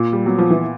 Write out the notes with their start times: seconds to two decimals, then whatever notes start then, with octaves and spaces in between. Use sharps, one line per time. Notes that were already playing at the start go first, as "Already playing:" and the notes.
Already playing: A#2
0.13 G3
0.26 F#3 B3
0.38 F3
0.50 E3